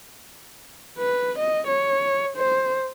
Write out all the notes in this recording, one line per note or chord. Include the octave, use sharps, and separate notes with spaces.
B4
D#5
C#5
C5